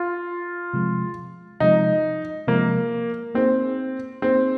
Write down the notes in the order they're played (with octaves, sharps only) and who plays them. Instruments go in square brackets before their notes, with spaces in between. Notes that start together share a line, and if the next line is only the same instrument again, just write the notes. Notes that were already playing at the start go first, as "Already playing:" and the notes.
Already playing: [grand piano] F4
[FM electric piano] C3 F3 G#3
[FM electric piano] C3 F3 G#3 [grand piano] D#4
[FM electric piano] C3 F3 G#3 [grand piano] A#3
[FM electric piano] A#3 D#4 G#4 [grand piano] C4
[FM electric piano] A#3 D#4 G#4 [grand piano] C4